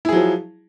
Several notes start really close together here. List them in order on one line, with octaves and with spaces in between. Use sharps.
E4 G#4 F#3 F3